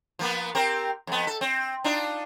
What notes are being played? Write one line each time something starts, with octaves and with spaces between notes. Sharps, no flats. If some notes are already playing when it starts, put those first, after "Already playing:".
F3 A#3 B3
C4 G4 A#4
F2 B3
A4
C4
D4 D#4 F4